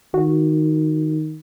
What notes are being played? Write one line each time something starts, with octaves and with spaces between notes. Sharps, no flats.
D#3 F#4